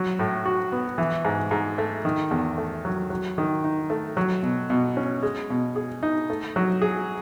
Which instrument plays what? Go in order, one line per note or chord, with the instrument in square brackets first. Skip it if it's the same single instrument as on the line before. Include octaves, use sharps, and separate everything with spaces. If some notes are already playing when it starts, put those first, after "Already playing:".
Already playing: [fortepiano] F#3
A2
F#4
B3
E3
G#2
G#2
A3
D#3
E2
A3
F#3
F#3
D#3
D#4
A3
F#3
B2
B2
C#4
G#3
B2
G#4
D#4
A3
F#3
G#4